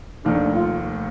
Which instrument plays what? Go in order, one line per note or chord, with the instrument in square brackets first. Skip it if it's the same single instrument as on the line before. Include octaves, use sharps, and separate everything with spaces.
[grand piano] F1 D#2 D#3 A3 [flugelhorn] D4
[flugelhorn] F4